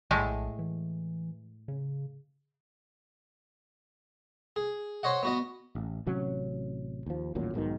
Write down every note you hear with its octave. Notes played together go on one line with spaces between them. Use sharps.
A#1 A2 G#3 A3
E3
C#3
G#4
C5 C#5 D#5 F#5
B3 F#4 D#5
A1
A1 C3 F#3 C#4
D#2 F3
A1 D#2 A#2 F#3
B1 G#2 B2 D#3